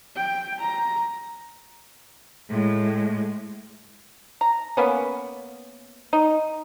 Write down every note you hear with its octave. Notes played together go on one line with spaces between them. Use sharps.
G5
A#5
A2 G#3
A#5
A#3 B3 C#4
D#4